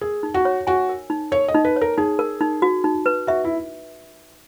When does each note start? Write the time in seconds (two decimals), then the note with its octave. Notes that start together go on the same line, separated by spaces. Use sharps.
0.01 G#4 A#4
0.23 D#4
0.34 F#4
0.45 C#5
0.67 F#4 G#5
0.89 A#4
1.10 D#4
1.32 A#4 C#5
1.48 D#5
1.54 D#4
1.65 B4
1.76 C#5
1.81 A#4
1.97 D#4 G#4
2.19 A#4
2.41 D#4
2.62 F#4
2.84 D#4
3.06 B4
3.27 F#4 E5
3.44 E4